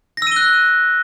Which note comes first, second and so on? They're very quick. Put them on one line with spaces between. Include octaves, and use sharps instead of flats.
A#6 E6 D#7 G7 F#6